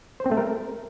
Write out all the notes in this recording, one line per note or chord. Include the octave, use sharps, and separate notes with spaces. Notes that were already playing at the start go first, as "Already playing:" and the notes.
C5
C4
A3
A#4